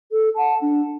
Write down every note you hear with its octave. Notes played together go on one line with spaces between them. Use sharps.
A4
F#5 A5
D4